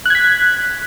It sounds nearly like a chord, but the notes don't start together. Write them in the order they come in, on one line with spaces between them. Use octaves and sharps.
F#6 G#6 B6